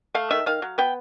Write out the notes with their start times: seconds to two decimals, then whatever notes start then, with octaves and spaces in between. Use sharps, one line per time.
0.14 A3 F5
0.31 D#3 E5
0.46 D#3 F5
0.62 F#3
0.78 B3 G5